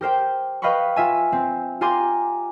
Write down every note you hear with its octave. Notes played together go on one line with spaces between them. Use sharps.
G4 A#4 C5 G5
B4 D#5 F5 G5 B5 C#6
F4 E5 G#5
C4
F4 G4 G#5 A#5 C6 D6